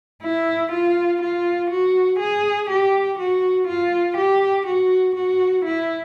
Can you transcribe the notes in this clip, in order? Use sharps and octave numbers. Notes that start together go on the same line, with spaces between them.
E4
F4
F4
F#4
G#4
G4
F#4
F4
G4
F#4
F#4
E4